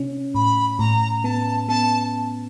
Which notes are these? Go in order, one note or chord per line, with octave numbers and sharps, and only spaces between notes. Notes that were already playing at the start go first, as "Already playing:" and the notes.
Already playing: C3 C#4
A2 B5
A2 A#5
B3 A5
B3 A5